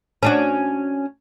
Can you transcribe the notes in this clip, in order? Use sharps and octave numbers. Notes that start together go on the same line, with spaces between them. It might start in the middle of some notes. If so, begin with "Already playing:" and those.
C#4 D4 F#4